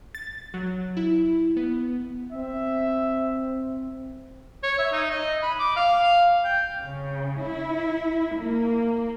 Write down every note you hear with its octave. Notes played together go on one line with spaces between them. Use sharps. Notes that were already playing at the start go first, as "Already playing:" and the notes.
A6
F#3
E4
B3
C4 E5
C#5
E5
D#4
D#5
B5
D6
F5
G5
C#3
E4
A#3